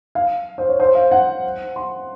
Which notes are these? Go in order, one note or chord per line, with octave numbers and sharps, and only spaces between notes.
F5
C5
C#5
C5
F5
F#5
C6